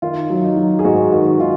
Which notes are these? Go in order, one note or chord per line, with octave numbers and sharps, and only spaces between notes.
D#3 F4
F#3
D#4
F#3
G#4
G#2 F#4
D#3 F#4
D#3 F4